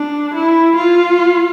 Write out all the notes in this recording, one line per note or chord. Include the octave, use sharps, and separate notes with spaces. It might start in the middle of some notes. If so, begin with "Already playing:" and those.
Already playing: D4
E4
F4